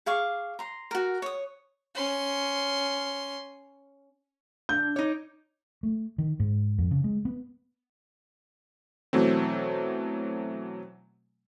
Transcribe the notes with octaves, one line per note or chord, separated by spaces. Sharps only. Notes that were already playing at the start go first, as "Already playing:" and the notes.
G#4 F5 C#6 D6
A#5 C6
F#4 A#4
C#5 D#6
C#4 C6
D4 G6
D#4 C#5 D6
A3
D#3
G#2
F2
C#3
G#3
B3
B2 E3 F#3 A3 C4